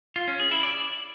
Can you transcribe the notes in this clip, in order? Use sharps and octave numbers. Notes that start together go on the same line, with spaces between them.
F4
C#4
G#4
E4
D5